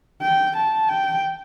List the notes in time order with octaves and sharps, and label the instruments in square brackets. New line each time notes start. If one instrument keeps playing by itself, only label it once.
[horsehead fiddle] G5
A5
G5